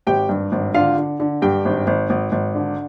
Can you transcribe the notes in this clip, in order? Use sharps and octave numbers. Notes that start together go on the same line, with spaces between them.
G#1 G4 G5
G2
G#1
D3 F4 F5
D3
D3
G2 G4 G5
G#1
G#1
G#1
G#1
D3